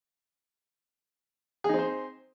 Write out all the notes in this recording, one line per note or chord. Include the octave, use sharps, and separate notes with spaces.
C4 D#4 G#4 C5